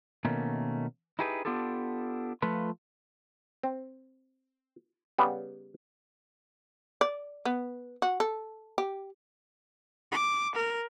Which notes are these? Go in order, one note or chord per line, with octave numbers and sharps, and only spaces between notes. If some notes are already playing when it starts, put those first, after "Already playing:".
B2 D#3 A3 A#3 C#4
D#4 E4 G4 G#4 B4
B3 D4 F4 G4 A4
F3 A3 F4 B4
C4
C#3 G3 B3
D5
B3
F#4
A4
G4
D6
A#4